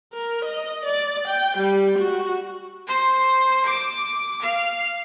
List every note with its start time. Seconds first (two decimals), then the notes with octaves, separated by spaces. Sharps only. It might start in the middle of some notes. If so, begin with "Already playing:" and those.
0.13 A#4
0.45 D#5
0.86 D5
1.28 G5
1.58 G3
1.99 F#4
2.87 C5
3.66 D6
4.42 F5